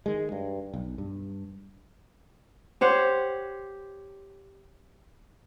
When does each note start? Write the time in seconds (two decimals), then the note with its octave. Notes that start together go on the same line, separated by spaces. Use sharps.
0.06 D#3 G#3
0.32 G2
0.74 B1
0.98 G2
2.81 G4 C5 C#5 F#5